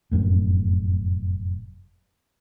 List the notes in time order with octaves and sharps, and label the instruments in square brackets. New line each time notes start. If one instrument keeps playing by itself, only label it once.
[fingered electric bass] F1 F#2 A2